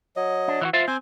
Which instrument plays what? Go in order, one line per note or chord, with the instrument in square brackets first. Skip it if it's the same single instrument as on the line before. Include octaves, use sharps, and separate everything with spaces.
[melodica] F#3 D#5
[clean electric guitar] D4
E3 E4 F#4
F4 C5 E5
[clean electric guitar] C4 [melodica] C5 G#5